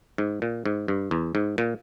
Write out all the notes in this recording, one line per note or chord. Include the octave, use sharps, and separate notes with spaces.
G#2
A#2
G#2
G2
E2
G#2
A#2